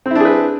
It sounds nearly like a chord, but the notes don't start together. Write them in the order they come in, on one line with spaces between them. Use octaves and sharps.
C4 E4 D4 G#4 B4